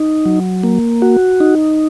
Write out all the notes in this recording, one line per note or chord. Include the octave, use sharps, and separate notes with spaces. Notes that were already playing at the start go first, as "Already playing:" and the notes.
Already playing: D#4
F#3
A#3
F#4
D#4